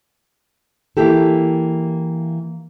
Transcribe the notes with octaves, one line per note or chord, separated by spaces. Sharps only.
E3 A#3 E4 G4 A4